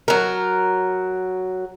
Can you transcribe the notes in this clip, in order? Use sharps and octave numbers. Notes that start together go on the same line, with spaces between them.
F#3 A#4